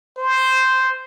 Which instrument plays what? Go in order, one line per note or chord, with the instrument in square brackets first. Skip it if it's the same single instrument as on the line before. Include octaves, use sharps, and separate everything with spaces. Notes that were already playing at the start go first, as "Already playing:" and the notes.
[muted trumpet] C5